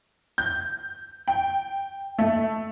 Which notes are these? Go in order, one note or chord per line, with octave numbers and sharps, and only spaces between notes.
G6
G5
A3